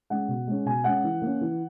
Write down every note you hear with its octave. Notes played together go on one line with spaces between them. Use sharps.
G#3 C#4 F#5
B2
G#3 C#4
B2 G#5
G#3 C#4 F#5
E3
A#3 C#4
E3